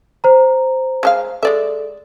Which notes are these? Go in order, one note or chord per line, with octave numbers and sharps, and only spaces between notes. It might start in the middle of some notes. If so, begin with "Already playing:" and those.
C5 A#5
G#3 A4 F5
G#3 A4 D5 E5